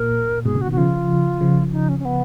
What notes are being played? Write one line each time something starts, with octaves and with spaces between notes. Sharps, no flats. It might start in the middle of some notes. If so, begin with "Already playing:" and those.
Already playing: A#2 A#4
G#2 B2 G#4
A#2 C#3
F#4
B2 D#3
F#4
C#3 F3 F4
C#3 F3
D#4
C#4
C#4
B3